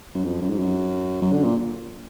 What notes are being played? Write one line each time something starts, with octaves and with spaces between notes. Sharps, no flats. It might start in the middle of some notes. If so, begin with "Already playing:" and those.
F#2
F2
F#2
G#2
F#2
F#2
D3
A#2